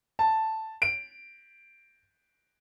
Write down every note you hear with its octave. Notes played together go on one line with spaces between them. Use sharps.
A5
D7